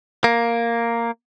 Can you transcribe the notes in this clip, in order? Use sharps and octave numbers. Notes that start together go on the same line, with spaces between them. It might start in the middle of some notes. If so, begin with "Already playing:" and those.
A#3